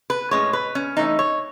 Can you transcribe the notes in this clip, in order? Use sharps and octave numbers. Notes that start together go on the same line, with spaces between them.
B4
A2 G#3 C#4 C#5
B4
C#4
E3 A3 C#4 D#4
C#5